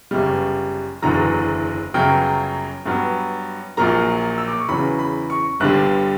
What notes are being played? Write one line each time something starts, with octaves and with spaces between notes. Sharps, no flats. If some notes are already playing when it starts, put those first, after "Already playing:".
G1 F#2 C#3 G3
F#1 E2 D3 F#3 A#5
G1 F#2 C#3 F#3 G5
G2 F#3 B3
A#1 A#2 F#3 A#3 A#5
E6
D6
C#6
E2 C#3 F#3 C#4 B5
B5
C#6
G1 G2 D3 G3 F#6